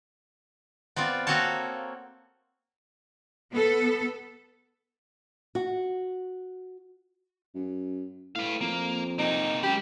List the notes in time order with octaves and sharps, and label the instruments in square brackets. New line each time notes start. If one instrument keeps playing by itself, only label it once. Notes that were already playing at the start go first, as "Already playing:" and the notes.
[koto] B3 C4 F4 D5
A#3 C4 F#4 A4 C#5 A5
[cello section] B3 A4
[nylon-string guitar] F#4
[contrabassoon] F#2
[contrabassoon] A2 [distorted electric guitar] B4 F5
[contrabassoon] F2 [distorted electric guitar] A#3
[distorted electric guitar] C3 A#3 [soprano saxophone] D#4
[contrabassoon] F#2 [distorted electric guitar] G#3 B5 [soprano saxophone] G4